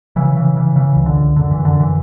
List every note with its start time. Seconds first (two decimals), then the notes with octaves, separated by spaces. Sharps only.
0.16 C#3 E3
0.36 C#3 E3
0.56 C#3 E3
0.76 C#3 E3
0.96 C#2
1.06 D3
1.16 C#2
1.36 F#2 D3
1.51 F#2 E3
1.65 D3
1.75 F#2 E3